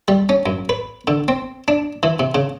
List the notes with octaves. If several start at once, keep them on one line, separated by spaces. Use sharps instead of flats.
G3
C#4
F#2
B4
D3
C4
D4
E3
C3
C#3